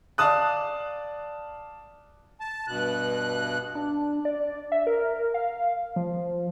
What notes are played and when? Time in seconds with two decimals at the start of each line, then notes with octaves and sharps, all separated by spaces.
0.18 D5 F5 A5 D#6 F#6
2.40 A5
2.67 G2 B2 F#6
3.75 D4
4.25 D5
4.72 E5
4.87 A#4
5.34 F5
5.96 F3